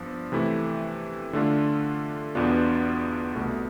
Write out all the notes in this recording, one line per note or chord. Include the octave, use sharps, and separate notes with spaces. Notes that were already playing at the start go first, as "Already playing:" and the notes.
Already playing: G2 F3 B3 D4
C3 E3 A3 E4
D3 A3 D4 F4
E2 B2 B3 D4 F4
C2 B2 A3